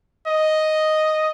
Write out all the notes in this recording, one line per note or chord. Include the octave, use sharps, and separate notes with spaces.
D#5